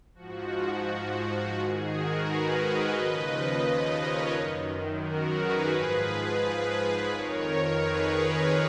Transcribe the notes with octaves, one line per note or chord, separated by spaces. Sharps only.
G#2 F3 F#4
G#2 D#3 G#4
F#4 A#4
G#4 B4
B4 D#5
D#2 C#3 F3
B4 D#5
A#4 C#5
F#2 D#3
F#4 A#4
G#4 B4
G#2 F3
F2 D#3 A#4 C#5
G#4 B4